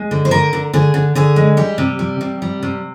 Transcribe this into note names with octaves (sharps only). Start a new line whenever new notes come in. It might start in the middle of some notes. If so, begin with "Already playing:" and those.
Already playing: G#3
D3
C5
D3 A#4
D3
D3 G#4
D3
D3 G#4
G#3
G3 G4
C3
G3
C3
G3
C3